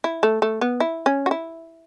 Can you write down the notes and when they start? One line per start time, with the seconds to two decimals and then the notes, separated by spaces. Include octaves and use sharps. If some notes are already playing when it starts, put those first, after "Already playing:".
0.04 E4
0.23 A3
0.42 A3
0.61 B3
0.80 E4
1.06 C#4
1.26 F#4
1.31 E4